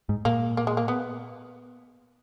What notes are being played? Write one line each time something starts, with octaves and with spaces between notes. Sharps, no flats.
G#2
A#2 A#3
A#3
G#3
A#3
B3